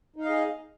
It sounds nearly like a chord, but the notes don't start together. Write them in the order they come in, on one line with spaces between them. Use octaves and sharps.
D#4 F5 D#5 G#4